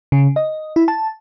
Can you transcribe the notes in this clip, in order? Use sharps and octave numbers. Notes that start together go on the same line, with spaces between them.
C#3
D#5
E4
A5